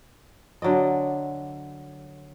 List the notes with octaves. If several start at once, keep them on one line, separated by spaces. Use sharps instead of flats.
D3 F#3 D5 D#5